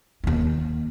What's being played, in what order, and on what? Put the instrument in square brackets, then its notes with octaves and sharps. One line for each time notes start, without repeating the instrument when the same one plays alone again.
[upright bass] D#2 A#3